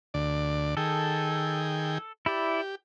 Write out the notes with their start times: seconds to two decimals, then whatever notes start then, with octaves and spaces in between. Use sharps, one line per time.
0.14 D2 D5
0.77 D#3 G#4 A4 G5
2.26 E4 G4 D5